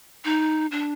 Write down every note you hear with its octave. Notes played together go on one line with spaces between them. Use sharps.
D#4
D4